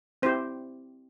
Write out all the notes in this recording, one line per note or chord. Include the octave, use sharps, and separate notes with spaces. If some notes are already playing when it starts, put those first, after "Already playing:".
C4 E4 G4 C5